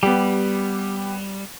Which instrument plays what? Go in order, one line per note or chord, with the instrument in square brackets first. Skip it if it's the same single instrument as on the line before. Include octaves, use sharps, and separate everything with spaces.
[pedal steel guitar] G3 [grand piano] B3 G4